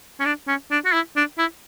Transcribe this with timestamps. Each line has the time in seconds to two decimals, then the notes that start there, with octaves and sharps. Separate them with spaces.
0.20 C#4
0.25 D4
0.48 C#4
0.71 D4
0.85 F#4
0.93 E4
1.16 D4
1.38 E4